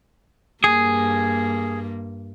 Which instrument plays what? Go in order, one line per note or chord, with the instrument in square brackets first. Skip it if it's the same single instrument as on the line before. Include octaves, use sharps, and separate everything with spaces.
[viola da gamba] G2 A#3 [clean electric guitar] G#4